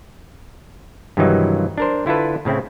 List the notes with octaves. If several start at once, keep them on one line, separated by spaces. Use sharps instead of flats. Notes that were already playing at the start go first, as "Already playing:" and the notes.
G2 C3 D#3 E3 F#3 D#4
D4 A#4 C5
D3 E4 F4 A4 B4
A2 C#3 C4 E4